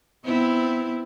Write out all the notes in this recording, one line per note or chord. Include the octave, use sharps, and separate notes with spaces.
B3 C4 E4